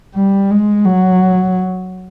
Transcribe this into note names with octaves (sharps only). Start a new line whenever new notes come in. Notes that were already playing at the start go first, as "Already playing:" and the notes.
G3
G#3
F#3